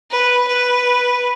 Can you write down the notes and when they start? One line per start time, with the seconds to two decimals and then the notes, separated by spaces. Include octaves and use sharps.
0.11 B4
0.47 B4